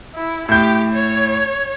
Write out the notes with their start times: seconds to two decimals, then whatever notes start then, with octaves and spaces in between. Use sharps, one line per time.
0.15 E4
0.49 A2 G4 G6
0.93 C#5